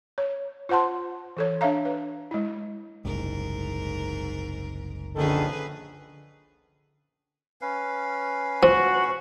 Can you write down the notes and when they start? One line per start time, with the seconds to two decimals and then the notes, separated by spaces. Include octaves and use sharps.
0.18 C#5
0.69 F4 C5 F#5 A5 C6
1.37 E3 A4 C#5
1.61 D4 C#5 E5 F5 A#5
1.85 B4
2.31 G#3 E4
3.05 F#1 C2 G#2 A#4
5.16 A#1 D3 D#3 C#4 G#4 A4 B4
7.61 C#4 B4 F5
8.63 F3 F#4